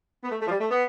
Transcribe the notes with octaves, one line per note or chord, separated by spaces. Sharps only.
B3
A3
A3
F3
G3
A3
B3